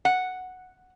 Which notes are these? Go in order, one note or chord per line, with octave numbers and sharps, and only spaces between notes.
F#5